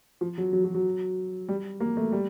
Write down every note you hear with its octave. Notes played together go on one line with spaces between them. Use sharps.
F3
F#3
F#3
F#3
F#3
G3
A#3
A3
G3